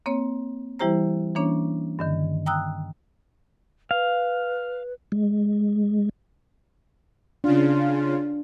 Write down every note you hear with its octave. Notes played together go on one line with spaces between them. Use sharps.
A#3 C4 C#5
E3 G3 E4 G4 C5 A#5
E3 A#3 C#4 D4 C#5
G2 D3 D#3
G5 A#5 D#6 E6 F#6
B4 F5
G#3
C#3 D4 F4